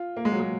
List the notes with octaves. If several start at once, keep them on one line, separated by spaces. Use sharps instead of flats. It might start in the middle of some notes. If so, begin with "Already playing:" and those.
Already playing: F4
A#3
G#3
F#3
G#3